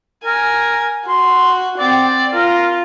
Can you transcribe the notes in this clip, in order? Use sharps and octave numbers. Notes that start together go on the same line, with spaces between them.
A#4 G#5
F#4 C6
C4 D5
F4 A#4